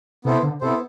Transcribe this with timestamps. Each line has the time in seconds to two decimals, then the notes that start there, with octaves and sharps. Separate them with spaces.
0.25 C3 B3 E4 A4 C5
0.43 D3
0.61 C3 B3 E4 A4 C5